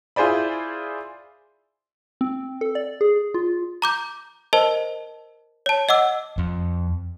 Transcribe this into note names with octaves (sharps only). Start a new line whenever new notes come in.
E4 F4 G#4 C5 D5 B5
C4
A4
D5
G#4
F4
A#5 D6 G6
A#4 C5 D#5 A5
C#5 A5
D#5 F#5 D6 E6
F2